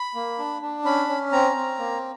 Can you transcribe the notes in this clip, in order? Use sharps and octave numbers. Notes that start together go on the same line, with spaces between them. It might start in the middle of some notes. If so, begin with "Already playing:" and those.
Already playing: B5
A#3
D4
D4
C#4 B5
C#4
C4 A#5
C4
A#3